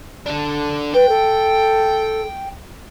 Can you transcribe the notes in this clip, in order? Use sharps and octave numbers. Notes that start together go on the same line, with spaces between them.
D4 A4
B4 G5
A4